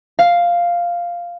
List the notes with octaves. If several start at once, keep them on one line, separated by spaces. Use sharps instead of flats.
F5